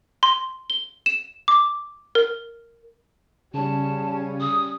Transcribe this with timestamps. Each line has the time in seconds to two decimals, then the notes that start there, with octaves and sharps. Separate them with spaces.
0.23 C6
0.70 G7
1.06 E7
1.48 D6
2.15 A#4
3.54 C#3 G3 C#4 A5
4.40 D#6